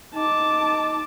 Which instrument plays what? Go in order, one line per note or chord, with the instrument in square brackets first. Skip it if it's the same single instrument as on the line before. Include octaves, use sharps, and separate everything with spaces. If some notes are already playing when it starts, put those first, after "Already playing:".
[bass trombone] D#4 [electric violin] A5 D6